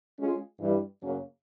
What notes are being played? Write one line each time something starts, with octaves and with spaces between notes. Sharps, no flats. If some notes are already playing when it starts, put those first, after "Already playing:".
G#3 C#4 F4 G#4
G2 E3 G3
F#2 C#3 F#3 A#3 C#4